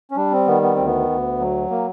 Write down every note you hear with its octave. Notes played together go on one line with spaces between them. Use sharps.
C#4
G3 D4
C4
D#3 B3
B3
D2 C4
B3
D2
F#3
A#3